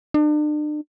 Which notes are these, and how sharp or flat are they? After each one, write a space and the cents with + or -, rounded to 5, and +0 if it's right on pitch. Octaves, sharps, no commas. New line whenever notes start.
D4 +40